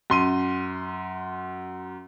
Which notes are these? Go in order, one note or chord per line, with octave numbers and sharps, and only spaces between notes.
F#2 C6 D#7